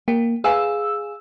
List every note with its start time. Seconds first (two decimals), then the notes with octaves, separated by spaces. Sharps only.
0.08 A#3 G5
0.44 G#4 B4 F5 G#5 E6